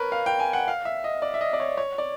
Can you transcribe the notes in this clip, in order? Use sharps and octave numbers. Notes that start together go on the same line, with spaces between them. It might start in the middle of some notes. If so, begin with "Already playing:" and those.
Already playing: A#4 B4 C#5
F5
G5
G#5
F#5
F5
E5
D#5
D5
E5
D#5
D5
C#5
C#5
D5